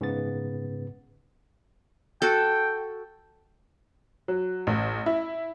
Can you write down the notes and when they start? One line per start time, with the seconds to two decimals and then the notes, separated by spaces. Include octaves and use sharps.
0.01 G#2 C#3 B3 A6
2.22 F#4 A4 G5
4.28 F#3
4.67 A1
5.06 E4